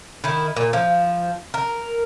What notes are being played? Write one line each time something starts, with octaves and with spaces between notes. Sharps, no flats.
D#3 E4
A#2
F3
A#4